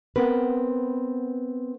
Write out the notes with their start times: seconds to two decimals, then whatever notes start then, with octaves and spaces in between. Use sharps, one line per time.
0.16 B3 C4 A#4 B4